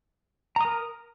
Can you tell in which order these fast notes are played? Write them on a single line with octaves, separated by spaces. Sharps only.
A#5 D#6 A#4